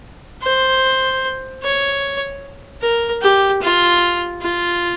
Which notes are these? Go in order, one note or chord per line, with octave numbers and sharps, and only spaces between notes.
C5
C#5
A#4
G4
F4
F4